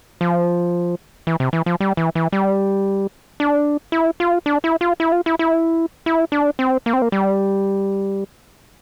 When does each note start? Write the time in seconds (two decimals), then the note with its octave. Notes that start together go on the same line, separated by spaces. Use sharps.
0.21 F3
1.27 E3
1.40 C3
1.53 E3
1.66 F3
1.80 G3
1.97 E3
2.15 E3
2.33 G3
3.40 D4
3.92 E4
4.20 F4
4.46 D4
4.64 E4
4.81 F4
5.00 E4
5.12 F4
5.26 E4
5.39 E4
6.06 E4
6.32 D4
6.59 C4
6.86 A#3
6.93 C4
7.02 A#3
7.12 G3